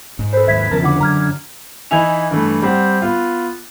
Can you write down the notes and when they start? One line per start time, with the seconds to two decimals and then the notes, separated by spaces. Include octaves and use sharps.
0.19 G#2
0.33 A4 B4 C5
0.48 D#2 G#2 E5 G#6 B6
0.72 E2 C#3 F3 A#4 A5
0.83 D3 E4 F#5 D6
1.00 F#2 A#5 F6 G#6
1.91 E3 D#4 E4 E5 G#5 F7
2.31 G2 E3 A3
2.62 G3 C4 F#5
3.02 B3 F4